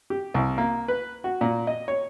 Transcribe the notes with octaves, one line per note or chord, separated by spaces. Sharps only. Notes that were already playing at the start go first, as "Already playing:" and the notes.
G4
C2
A#3
B4
F#4
A#2
D#5
C#5